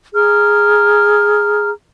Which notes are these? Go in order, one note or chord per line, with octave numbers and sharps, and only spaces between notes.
G#4 A#5 F6